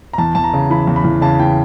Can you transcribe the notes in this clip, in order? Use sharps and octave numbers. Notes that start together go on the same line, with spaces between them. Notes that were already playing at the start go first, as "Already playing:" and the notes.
A#5
E2 A5
E2 A5
A#5
C#3
E3 B5
E2
B5
E2
C#3 A5
E3 G5